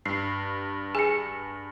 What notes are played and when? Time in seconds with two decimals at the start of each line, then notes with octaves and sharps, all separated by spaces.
0.05 G2 C7
0.95 G#4 G#5 C#7